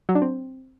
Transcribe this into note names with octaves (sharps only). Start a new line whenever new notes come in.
F#3
D4
C4